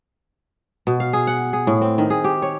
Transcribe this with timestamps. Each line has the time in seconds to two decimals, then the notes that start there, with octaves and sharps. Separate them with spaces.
0.87 B2
1.00 F5
1.13 G#4
1.27 F#5
1.53 G#4
1.67 A2
1.81 C4
1.98 D#3
2.10 G#4
2.24 G4
2.42 C#5